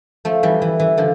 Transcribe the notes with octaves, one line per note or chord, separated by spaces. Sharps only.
F3 A3
E3 G3
E3
E3
D3 F3